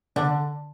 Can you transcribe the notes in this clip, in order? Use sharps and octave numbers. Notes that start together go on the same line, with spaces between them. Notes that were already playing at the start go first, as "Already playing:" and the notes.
D3 D4